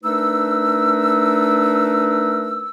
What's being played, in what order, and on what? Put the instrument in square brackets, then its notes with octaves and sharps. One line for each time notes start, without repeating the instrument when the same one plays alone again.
[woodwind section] A3 D4 D#4 A#4 B4 E6